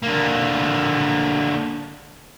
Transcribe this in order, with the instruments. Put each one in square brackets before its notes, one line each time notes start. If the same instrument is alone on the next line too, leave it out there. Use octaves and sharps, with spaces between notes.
[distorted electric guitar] D3 A#3